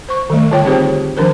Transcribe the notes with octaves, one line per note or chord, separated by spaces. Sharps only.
C5 C#6
D#3 G3 A3
D3 F4 C#5 G5
C4 D#4 G4 G#4 C5
D#3 F3 D4 A#4 C5